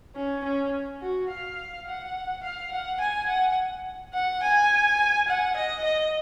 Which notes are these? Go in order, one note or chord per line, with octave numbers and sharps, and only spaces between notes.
C#4
C#4
F#4
F5
F#5
F5
F#5
G#5
F#5
F#5
G#5
F#5
D#5
D#5